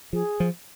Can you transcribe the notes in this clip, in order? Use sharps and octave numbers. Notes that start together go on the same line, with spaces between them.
F3 G#4
F3